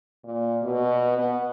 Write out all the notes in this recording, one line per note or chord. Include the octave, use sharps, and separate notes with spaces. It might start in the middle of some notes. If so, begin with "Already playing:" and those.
A#2
B2
B3